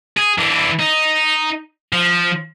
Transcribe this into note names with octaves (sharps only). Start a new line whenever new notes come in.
G#4
E3 D4
D#4
F3